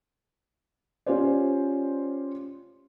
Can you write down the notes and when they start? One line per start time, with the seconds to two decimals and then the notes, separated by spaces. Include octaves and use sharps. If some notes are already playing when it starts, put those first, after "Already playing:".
1.06 C#4 F4 G4 C5 D5